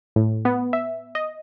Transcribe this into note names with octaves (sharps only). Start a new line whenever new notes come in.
A2
B3
E5
D#5